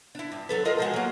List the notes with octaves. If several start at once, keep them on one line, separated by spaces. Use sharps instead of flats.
D4 E4
G2
F#3 A4 B4
F4 A#4 D#5
F3 G#3 F#4
F#3 A#3